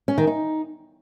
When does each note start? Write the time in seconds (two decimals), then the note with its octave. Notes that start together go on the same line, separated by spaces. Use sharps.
0.08 C#4
0.18 D#3
0.27 D#4